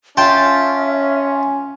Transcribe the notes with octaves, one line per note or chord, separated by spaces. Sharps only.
C#4 F4 E5 G5 A5